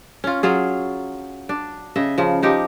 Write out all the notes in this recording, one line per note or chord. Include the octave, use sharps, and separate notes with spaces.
C#4 F4
F#3 F4 G#4
D4
C#3 D#5 E5
C#3 F3
F3 D#4 G4